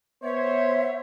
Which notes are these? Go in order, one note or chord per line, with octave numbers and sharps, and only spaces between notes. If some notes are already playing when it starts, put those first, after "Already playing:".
B3 C5 C#5 E5